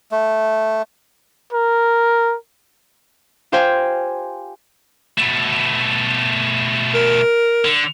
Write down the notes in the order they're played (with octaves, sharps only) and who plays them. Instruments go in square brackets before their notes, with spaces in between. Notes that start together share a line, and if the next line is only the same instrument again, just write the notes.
[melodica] A3
[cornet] A#4
[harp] F4 G4 C5 F5 G5 G#5
[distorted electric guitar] B2 A3
[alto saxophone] A#4
[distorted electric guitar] D3